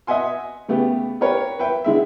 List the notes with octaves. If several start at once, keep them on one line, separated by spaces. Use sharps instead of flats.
D#5 E5 F#5 G#5 C6
C#3 A3 B3 G4
G4 A#4 B4 C#5
B4 E5 G5
D3 G#3 E5